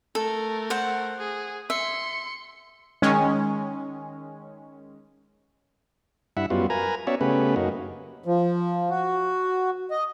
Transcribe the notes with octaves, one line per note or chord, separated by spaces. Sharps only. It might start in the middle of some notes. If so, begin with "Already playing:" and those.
A3 A4 A#4
C5 F#5
G#4
E5 C6 C#7
D#3 G#3 C#4
G2 E4 E5 F#5
F#2 G3 B3 F4 F#4
A#4 B4 G#5 A#5
B3 C#4 F#4 C#5 D5 E5
C#3 A3 B3 C#4 G4 B4
F#2 A#3 D#4 F#4
F3
F#4
D#5